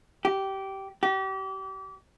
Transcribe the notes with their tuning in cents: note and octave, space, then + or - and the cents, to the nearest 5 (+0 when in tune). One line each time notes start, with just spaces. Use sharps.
G4 -15
G4 -35